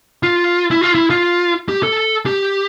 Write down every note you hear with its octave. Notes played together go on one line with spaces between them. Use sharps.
F4
E4
F4
E4
F4
G4
A4
G4